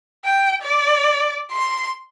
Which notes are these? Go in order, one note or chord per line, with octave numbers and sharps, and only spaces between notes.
G5
D5
C6